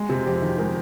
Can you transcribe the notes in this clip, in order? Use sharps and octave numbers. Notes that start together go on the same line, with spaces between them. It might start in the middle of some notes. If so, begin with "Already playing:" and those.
Already playing: G#3
C3
F2 G4
D#3
G#3 A#4